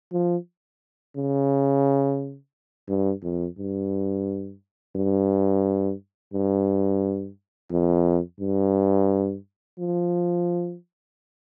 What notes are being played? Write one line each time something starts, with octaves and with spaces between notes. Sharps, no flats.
F3
C#3
G2
F2
G2
G2
G2
F2
G2
F3